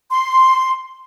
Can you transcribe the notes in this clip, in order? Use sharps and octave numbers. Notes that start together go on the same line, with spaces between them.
C6